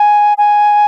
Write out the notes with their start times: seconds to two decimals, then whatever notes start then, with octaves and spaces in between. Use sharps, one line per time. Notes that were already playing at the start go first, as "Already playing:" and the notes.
Already playing: G#5
0.38 G#5